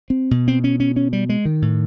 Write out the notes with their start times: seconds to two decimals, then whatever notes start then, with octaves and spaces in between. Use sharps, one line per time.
0.10 C4
0.31 B2
0.48 C4
0.64 C#4
0.80 C#4
0.96 C#4
1.13 G3
1.29 G#3
1.45 D#3
1.62 A2